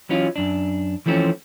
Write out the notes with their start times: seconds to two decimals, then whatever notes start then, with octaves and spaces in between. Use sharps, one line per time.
0.09 E3 F#3 C#4 F4
0.36 F#2 D4
1.06 E3 F3 A3 C4 C#4